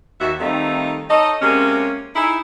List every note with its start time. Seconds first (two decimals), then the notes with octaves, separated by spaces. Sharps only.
0.21 D#2 F#4 E5
0.39 D#3 G3 A3 C4 D#4 F4
1.10 D#4 A4 C#5 D#5
1.41 C3 G#3 A#3 C#4
2.16 D#4 E4 G#4